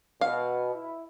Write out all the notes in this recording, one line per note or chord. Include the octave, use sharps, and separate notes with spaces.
B2 F5
E4